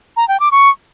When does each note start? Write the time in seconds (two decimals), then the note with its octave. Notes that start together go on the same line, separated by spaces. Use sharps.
0.17 A#5
0.28 G5
0.40 D6
0.51 C#6